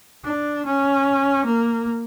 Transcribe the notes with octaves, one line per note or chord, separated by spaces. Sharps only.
D4
C#4
A#3